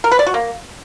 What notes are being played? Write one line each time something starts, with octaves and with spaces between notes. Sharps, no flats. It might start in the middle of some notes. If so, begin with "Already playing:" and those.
A#4
B4
D5
F#4
A#3